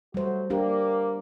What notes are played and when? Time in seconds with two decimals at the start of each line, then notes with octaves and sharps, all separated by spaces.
0.14 F#3 G3 A3 F#4 C5
0.50 A#3 D4 G4